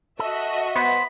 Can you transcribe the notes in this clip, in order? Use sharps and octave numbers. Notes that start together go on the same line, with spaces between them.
F#4 A4 D#5 E5
B3 C5 B5